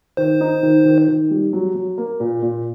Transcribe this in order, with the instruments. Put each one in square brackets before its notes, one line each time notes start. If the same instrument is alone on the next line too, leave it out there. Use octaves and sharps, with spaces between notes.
[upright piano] D#3 [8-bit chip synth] C5
[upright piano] D#4
D#3
D#3
D#3
G3
F#3
F#3
A#3
A#2
A#2